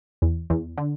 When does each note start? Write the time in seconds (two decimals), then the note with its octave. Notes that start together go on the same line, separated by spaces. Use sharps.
0.22 E2
0.50 E2
0.78 D3